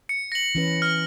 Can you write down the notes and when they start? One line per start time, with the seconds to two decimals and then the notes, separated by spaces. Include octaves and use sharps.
0.09 C#7
0.32 A#6 F#7
0.55 E3 C#4 B4
0.82 F6